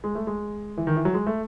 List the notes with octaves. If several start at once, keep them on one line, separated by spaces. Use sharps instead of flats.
G#3
A3
G#3
E3
D#3
E3
F#3
G#3
A3